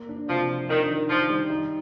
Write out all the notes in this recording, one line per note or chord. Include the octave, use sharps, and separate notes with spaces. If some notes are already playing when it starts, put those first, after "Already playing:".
Already playing: A#3
D4
C3 F3
F3
D#3 D4
D#3
D#3 F3
G3
D#4